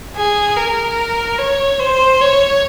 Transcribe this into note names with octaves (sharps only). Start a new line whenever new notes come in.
G#4
A#4
C#5
C5
C#5